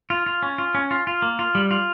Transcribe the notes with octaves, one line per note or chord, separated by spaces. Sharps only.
F4
F4
C#4
F4
C#4
F4
F4
A#3
F4
G3
F4